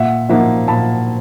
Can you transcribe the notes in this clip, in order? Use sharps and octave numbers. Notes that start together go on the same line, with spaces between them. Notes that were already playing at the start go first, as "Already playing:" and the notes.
Already playing: A#2 E5 F#5
F3 A#3 D#4 E5 F#5
A#2 A5 B5